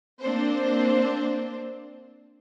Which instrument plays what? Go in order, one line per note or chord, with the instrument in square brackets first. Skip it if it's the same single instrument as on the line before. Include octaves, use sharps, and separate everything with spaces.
[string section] A#3 C4 D4 C5